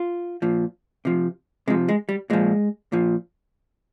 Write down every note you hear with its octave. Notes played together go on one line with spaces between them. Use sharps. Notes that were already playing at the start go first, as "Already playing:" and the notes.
Already playing: F4
A#2 F3
C3 F3
C3 F3 G#3
G#3
G3
A#2 F3 G#3
A#2 F3